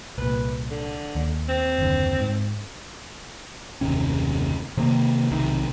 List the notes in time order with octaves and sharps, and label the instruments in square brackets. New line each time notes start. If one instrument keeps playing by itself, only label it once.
[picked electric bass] C2 A#2 [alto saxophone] B4
[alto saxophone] D3
[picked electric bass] D#2
[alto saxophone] C4
[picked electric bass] F#1 D#2 D3
G#2
F#1 D#2 C3 C#4
C3 D#3 A#3
B1 C3 D#3